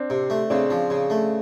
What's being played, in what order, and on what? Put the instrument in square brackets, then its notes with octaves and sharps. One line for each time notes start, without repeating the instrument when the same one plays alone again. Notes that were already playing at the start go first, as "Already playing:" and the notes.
Already playing: [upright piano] C4 D4
[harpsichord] C3
A3
[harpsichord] C#3 [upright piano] C4 D4
[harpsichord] F3
C#3
A3